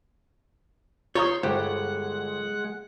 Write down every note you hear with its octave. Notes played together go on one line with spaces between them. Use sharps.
F4 C#5 A#5 C6 D#6 G6
G1 G#3 G4 C5 F#5